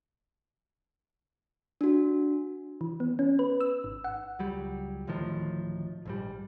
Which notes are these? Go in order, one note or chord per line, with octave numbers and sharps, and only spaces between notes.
D4 F#4
E3
B3
C#4
B4
E6
G#1
F#5
C#2 F#3 G3
D1 A2 D#3 F3
A#1 G#2 G3